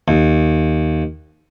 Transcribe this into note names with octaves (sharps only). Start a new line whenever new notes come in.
D#2